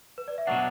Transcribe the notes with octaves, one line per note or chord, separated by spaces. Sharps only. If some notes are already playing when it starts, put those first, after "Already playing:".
B4
D5
E5
B2 F#3 D4 F#5